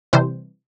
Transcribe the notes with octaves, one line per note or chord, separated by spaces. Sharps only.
C3 E3 G3 C5